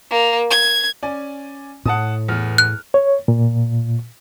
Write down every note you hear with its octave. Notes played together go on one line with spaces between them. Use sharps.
A#3
G#6
C#4 D5 G#5
A2 F#5 A5 D#6
E2 B3 F6
F#6
C#5
A#2